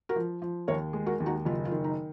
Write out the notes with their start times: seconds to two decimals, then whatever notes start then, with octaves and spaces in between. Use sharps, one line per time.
0.09 F#4 A#4
0.16 F3
0.42 F3
0.68 D#2 A#4 C#5
0.93 G#3
1.06 F#4 A#4
1.20 D#2
1.26 D#4 F#4
1.45 F#1 F4
1.65 F4
1.71 D#3
1.84 D#4